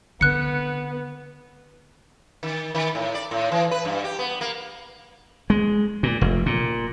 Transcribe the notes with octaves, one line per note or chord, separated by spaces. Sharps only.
D3 B3 C4 F#6 C#7
D#3
D#3
A2
D5
A2
E3
B4
G2
G4
B3
A#3
G#3
A#2
F1
A#2